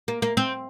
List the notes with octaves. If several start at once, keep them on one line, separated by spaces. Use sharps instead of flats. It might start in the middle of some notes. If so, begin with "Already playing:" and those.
A#3
A#3
C4